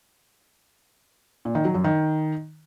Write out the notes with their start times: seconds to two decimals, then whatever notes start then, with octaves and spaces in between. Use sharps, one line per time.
1.45 A#2
1.55 D#3
1.65 F#3
1.75 F#2
1.84 D#3